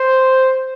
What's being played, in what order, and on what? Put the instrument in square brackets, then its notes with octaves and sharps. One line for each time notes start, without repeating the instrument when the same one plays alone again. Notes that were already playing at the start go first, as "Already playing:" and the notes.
Already playing: [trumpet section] C5